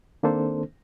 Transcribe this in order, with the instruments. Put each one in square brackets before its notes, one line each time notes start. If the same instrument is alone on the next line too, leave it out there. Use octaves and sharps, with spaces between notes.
[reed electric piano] D#3 A#3 C4 D4 A4 C5